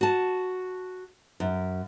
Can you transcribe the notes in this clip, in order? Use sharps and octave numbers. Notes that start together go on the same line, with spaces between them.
F#4 A5
F#2